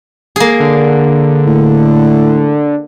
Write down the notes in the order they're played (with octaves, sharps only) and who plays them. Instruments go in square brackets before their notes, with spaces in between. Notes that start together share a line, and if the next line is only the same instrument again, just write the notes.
[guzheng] A#3 G#4
[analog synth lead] D3
[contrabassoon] A2